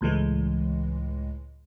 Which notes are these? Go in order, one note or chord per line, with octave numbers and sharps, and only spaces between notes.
C#2 A2 E3 G#3